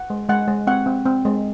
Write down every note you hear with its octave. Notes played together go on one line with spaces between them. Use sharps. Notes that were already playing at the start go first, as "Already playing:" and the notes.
Already playing: F#5
G#3
G#3 F#5
G#3
C4 F#5
C4
C4
G#3